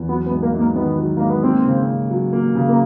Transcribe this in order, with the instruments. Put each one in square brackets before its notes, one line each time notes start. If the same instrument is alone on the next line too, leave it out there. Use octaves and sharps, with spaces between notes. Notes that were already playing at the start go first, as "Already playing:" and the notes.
Already playing: [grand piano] E2
[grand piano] F#3 [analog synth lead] B3
[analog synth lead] B3
[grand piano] G#2
[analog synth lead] A#3
[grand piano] G#2
[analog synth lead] A#3
[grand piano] D#3 [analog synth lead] B3
[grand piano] F#3
[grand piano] G#2 [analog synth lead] A#3
[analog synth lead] B3
[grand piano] A#3 [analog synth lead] C4
[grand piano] C#3
C#4
F#3
A#3
C#3
[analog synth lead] A#3